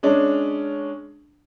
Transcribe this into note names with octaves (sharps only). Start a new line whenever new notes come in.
G#3 C#4 D4